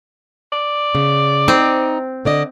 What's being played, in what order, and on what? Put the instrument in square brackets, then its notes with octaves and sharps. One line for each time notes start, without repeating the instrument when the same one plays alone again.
[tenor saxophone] D5
[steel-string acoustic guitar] C#3
[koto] C4 [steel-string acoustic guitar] D#4
[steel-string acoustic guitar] D3 D5 D#5